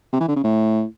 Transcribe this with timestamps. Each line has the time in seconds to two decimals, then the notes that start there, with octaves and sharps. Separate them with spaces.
0.13 C3
0.21 E3
0.28 D3
0.36 C#3
0.44 A2